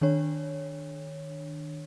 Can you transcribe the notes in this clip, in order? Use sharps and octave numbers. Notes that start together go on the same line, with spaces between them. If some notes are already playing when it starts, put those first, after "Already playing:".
D#3 D4 C#5